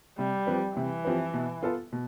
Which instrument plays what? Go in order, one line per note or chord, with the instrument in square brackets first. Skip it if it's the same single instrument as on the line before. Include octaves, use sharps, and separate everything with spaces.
[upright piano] C3 [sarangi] G3
[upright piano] F3 C4 G4 B4
[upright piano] C3 [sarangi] E3
[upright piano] F3 C4 G4 B4
B2
B3 F4 A4
B2